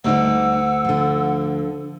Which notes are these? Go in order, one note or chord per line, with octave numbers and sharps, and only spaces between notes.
D2 G3 D#4 D5 F#5 E6
D3 F3